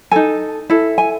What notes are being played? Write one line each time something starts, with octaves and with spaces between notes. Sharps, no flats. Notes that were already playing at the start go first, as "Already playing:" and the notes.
D#4 A4 G#5
E4 A4
G#5